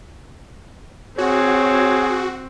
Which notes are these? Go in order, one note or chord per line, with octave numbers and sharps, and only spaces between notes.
C4 F#4 G#4 C#5